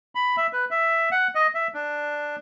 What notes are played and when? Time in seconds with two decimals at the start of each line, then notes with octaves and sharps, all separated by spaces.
0.15 B5
0.37 E5
0.53 B4
0.71 E5
1.12 F#5
1.35 D#5
1.55 E5
1.74 D4